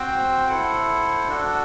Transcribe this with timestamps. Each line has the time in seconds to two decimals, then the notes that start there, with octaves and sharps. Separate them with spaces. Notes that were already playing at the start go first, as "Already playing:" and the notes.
Already playing: C4 F#4 C5 G5
0.48 E4 A4 C5 F#5
1.28 D4 F#4 A4